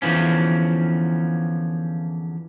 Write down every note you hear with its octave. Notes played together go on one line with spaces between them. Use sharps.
E2 D3 E3 F3 C#4